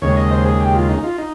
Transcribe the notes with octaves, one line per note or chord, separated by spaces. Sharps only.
D#2 C#3 G#3 C#5
D#5
C5
G#4
G4
F4
D#4
F4
D#4